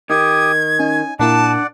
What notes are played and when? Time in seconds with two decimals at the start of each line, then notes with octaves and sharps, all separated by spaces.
0.10 D#3 G4 D#6 G#6
0.79 C#4 D#4 G#5
1.19 A#2 A#3 D4 E4 D5 F#5 A5